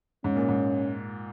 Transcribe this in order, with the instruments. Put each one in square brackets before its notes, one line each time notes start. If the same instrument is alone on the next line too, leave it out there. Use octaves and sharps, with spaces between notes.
[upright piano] G#2 [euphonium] C#4
[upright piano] A#2
G#2